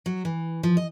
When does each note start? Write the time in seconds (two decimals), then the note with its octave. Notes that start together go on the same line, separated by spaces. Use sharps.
0.06 F#3
0.25 E3
0.63 F3
0.77 D#5